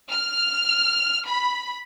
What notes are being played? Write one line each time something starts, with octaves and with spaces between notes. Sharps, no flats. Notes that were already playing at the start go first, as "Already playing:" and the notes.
F6
B5